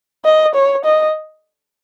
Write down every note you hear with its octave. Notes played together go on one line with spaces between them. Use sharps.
D#5
C#5
D#5